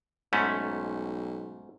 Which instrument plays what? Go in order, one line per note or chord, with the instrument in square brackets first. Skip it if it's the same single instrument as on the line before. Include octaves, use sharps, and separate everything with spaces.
[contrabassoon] B1 [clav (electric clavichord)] G#2 A3 C#4